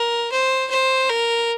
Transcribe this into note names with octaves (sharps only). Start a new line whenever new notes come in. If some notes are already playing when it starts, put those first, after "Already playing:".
Already playing: A#4
C5
C5
A#4